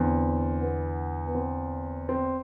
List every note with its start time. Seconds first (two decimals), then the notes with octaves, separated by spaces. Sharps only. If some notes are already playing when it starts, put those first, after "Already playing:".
Already playing: E2 D3 C4
0.62 B3
1.27 B3
1.35 C4
2.09 C4